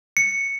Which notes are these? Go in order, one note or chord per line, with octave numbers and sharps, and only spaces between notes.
C#7